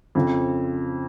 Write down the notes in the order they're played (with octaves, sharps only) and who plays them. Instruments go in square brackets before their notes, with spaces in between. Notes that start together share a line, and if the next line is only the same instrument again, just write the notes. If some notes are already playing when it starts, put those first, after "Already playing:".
[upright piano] F2 C#3 F3